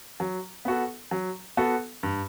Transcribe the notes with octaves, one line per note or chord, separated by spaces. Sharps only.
F#3
B3 F#4 A4
F#3
B3 F#4 A4
G2